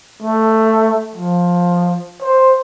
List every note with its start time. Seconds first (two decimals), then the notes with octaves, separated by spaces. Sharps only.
0.22 A3
1.16 F3
2.22 C5